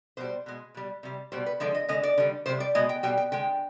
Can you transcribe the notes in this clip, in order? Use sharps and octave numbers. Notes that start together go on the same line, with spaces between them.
B2 G3 C5
B2 G#3
B2 G3
C3 G3
B2 G3 C5
B4
D3 F3 G#3 D5
D#5
D3 G#3 D#5
D5
D3 G3
C3 G3 C5
D5
B2 G#3 D#5
G5
B2 G3 G5
G5
D3 G#3 G5